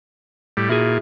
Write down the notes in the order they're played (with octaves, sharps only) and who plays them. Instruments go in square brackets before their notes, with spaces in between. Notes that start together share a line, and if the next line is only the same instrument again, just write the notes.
[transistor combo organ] A2 G3
[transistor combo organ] A#2 [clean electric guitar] E4 F#4 G#4